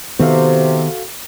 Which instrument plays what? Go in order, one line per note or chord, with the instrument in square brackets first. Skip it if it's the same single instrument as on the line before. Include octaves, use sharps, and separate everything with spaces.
[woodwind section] C3 [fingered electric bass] D#3 B3 [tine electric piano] F#4 A4 F5